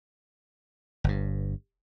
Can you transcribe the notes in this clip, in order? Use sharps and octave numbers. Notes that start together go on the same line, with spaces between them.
G1 G2